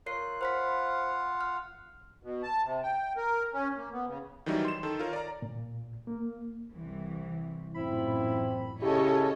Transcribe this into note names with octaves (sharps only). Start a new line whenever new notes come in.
F4 A#4 C#5 F#6 C7
F4 C5 F5 F#5 B5 B6
F6
B2
A5
C3
G5
A#4
C#4
A#3
B3
C#3
D#3 E3 F#3 G3 D#4 E4
C6 E7
D#3 A4
F4 A#4 C#5
D5 A#5
A#2
A#3
C2 E3
A1 F#2 A#2 C4 E4 B5
C#3 E4 G4 A4 C#5 D#5